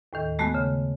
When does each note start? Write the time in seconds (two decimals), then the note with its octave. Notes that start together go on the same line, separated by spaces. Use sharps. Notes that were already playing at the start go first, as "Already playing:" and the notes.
0.13 D#2 A2 D#3
0.39 G#3 A3 B3 F#4
0.55 C#3